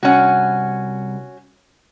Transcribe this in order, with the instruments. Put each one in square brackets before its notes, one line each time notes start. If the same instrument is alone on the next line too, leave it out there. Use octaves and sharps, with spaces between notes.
[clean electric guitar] C2 F#5 [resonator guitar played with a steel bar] C#4 F#4